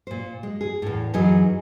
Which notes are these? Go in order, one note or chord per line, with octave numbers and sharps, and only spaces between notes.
A#2 C5
G#3
G#4
E2 A2
F#2 E3 F#3 D#4 G#4 D#5